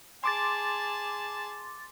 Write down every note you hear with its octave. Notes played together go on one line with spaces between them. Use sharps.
G#4 A5 C6 D6 A6